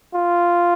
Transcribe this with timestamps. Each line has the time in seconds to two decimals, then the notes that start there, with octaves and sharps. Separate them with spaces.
0.14 F4